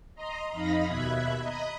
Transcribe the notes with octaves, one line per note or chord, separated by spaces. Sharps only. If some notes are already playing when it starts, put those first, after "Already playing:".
D#5 A#5 C6
F2 D#4 D#5 F5 B5 A#6
D#2 B2 E5 B5 F#6 G#6
D#5 A#5 B5 D#6